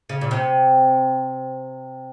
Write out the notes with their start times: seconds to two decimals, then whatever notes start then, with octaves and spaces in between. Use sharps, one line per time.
0.09 C#3
0.21 A#2
0.31 C3